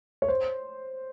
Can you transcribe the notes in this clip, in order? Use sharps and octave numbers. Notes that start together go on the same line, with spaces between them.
C#5
C5